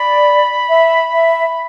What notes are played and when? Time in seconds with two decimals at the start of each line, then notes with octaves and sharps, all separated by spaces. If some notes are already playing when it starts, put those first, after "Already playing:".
Already playing: D5 B5
0.68 E5
1.12 E5